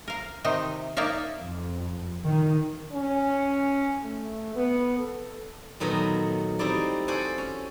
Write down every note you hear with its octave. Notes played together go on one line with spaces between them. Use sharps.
A#4 F5
C3 D#3 D#4 C5
A#3 D#4 D5 E5 F5
F2
D#3
C#4
A3
B3
A4
A#2 D#3 F#3 A3 B3
G3 C4 D#4 E4 D5
F#4 A4 C5 D5 F#5 G#5
C#4